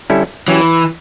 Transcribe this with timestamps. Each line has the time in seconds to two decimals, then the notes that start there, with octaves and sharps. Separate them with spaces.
0.10 D3 G3 C#4 E4 A4
0.48 E3 F#3 C#4 G4